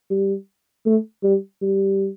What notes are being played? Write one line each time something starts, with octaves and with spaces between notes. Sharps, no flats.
G3
A3
G3
G3